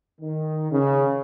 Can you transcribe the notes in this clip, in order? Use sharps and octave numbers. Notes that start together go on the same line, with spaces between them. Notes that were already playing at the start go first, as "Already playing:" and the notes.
D#3
C#3